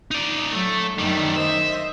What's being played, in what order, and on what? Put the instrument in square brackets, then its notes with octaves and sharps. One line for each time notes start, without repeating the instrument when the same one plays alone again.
[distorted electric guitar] D#4 D5
[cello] F#3 [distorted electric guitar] A3
[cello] F#2 D#3 [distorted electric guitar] G3 A3
[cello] C5 D#5 [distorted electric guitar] E5